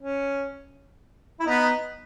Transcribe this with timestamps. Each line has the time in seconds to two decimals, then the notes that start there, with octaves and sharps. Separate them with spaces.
0.01 C#4
1.40 E4
1.46 B3 D#4